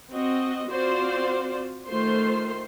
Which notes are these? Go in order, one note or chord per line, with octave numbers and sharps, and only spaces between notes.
C4 F#4 D#5
C4 F4 F#4 C5 D5
D#3 A3 F4 C5 C6